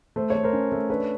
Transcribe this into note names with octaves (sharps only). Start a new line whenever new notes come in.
A3 C5
A3 C#5
A#4 C5
C#4
A3
D4 B4 C#5